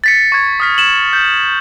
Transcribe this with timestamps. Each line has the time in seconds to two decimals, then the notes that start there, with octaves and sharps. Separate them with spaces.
0.04 A6 B6 C#7
0.32 C#6 G#6
0.60 D#6 F6 B6
0.78 E7 F#7
1.13 G6